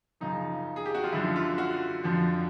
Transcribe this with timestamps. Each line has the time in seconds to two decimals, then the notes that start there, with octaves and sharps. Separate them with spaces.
0.21 F#2 C#3 F3 D#4
0.76 G#4
0.85 G4
0.95 F#4
1.04 F4
1.12 F#2 D3 F3 E4
1.36 F4
1.58 F#4
2.04 F2 D3 F3